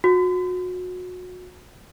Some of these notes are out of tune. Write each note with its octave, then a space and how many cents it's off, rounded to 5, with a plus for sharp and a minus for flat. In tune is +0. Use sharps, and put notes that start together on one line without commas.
F#4 -30